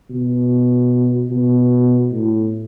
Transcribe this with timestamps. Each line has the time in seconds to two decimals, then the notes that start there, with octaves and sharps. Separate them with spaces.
0.10 B2
1.31 B2
2.11 A2